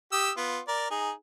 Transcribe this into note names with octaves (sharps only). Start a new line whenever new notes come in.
G4 D#6 E6
B3 F4
A#4 D5
D#4 G#4